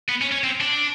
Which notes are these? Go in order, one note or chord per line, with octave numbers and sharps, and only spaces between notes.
B3
C#4
C#4
C4
D4